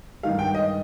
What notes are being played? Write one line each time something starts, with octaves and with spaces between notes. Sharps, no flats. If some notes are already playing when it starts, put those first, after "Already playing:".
G2 D#3 G#3 F5
G5
D#5